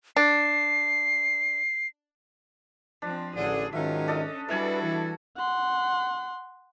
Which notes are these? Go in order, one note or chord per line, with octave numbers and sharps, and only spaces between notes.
D4 C7
F3 C4 D4
A1 D3 G#4
G#2 D#3 F#3 C#4 D#4 F4 E5
D4 A4 D#5
G3 D4 E4 F#4 A4 B4 G#5
E3
F#5 C6